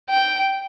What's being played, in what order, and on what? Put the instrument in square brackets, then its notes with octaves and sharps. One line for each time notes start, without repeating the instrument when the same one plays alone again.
[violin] G5